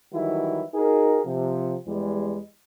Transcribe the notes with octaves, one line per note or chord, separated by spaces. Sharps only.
D#3 E3 F#3 G3 E4
D#4 F#4 G#4 A#4
C3 F3
E2 G3 G#3